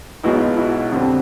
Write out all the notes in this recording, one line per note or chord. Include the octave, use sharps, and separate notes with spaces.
B1 B2 G#3 B3 D#4 E4 F#4
F4
E4 F#4
F2 D3 G3 C4